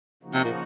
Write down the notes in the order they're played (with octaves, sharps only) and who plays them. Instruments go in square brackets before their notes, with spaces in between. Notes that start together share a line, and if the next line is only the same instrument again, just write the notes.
[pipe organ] C#3 F3 A#3 D#4 F#4
[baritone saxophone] C3
A#2